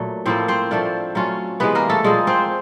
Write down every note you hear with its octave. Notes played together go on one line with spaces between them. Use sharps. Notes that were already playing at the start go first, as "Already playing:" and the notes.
Already playing: A#2 F#3 A3
A2 F3 A#3 C4 C5
C4 C5
F3 A3 D4 F4
F#3 A3 C#4 F4
C3 E3 G#3 B3 B4
A#3 A#4
A3 A4
A#2 F3 G#3 A#3 G#4
C4 C5